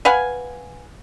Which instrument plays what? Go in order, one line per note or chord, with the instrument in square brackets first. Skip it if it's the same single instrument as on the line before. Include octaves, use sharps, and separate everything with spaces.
[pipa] B4 F5 F#5 G#5